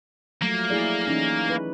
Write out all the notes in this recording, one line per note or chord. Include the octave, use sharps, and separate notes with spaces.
F3 F#3 A3 A#3
E4 G#4 D5
E3 C#4 D#4
B4